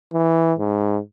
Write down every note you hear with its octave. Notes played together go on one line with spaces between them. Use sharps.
E3
G#2